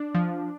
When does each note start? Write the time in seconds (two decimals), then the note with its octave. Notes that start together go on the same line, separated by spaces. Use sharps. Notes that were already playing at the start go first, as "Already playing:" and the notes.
Already playing: D4
0.15 F3